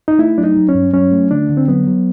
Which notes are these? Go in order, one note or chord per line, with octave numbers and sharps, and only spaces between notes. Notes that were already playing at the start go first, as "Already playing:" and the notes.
D#4
A3 E4
F#3 D4
D#4
F#3
C#4
G2
F#3 C#4
A3
D3 D4
D3
C4
F#3 B3
F#3